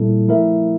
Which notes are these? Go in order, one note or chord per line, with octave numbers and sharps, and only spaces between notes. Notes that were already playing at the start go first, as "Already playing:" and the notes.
Already playing: A#2 G3 A#3 E4 A4
F3 A3 E4 A#4 E5